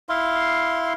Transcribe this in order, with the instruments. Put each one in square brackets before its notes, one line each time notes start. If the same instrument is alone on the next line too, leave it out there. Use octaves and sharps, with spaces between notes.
[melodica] E4 F5 C6